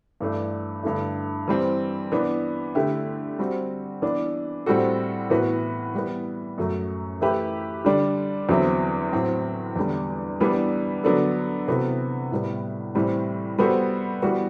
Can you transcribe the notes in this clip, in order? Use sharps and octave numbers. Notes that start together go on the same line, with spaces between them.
G2 E3 A3 D4
G2 D3 A3 E4
E3 G3 C4
E3 B3 D4
D3 A3 E4 G4
G3 C4 F#4
E3 B3 D4
A2 G3 C4 F#4 A4
A2 E3 B3 F#4 B4
E3 G3 B3
F#2 F#3 A3
E3 A3 E4 G4 B4
D3 G3 D4
E2 D3 F#3 C4 E4
A2 F#3 C4 F#4
E2 D3 G3
E3 G3 B3 D4
D3 F#3 B3 D4 A4
C3 E3 B3 F#4 A4
A2 G3 B3
A2 E3 G3 C4
G3 B3 F#4 A4 C5
E3 G3 B3 F#4